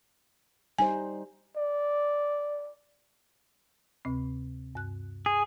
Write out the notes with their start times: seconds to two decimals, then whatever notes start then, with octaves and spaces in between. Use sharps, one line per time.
0.79 G3 D#4 C5 G#5
1.56 D5
4.05 D2 C3 C4
4.75 G2 F#6
5.26 G#4